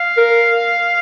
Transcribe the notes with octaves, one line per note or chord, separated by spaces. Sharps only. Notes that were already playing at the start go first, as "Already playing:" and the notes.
Already playing: F5
A#4